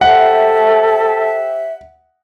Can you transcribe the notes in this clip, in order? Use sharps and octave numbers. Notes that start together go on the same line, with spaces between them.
G4 A4 C5 E5 F#5